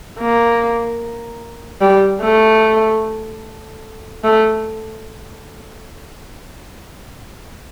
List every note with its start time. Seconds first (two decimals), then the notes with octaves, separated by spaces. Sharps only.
0.19 A#3
1.81 G3
2.21 A3
4.24 A3